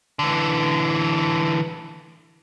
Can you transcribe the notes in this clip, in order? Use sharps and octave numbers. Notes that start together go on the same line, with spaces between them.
D3 E3